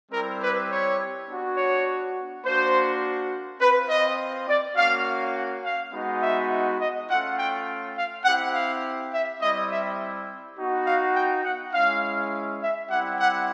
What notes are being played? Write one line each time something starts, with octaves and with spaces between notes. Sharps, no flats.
G3 C4 E4 G4 A#4
B4
C#5
B3 D4 F#4
C#5
A#3 D4 F#4 C5
C4 F4 B4
D#5
D5
A#3 C#4 F#4 F5
F#5
F5
G#3 B3 D#4 F#4
E5
D#5
A3 C#4 F4 F#5
G5
F5
C4 E4 G4 F#5
F5
E5
G3 C4 E4 D#5
E5
B3 D#4 F#4
F5
G5
F#5
G#3 C#4 E4 F5
E5
G3 C4 E4 G4 F#5
F#5